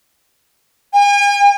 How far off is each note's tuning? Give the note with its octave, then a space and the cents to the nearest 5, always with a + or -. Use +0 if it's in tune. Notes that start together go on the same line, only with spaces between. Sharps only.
G#5 -45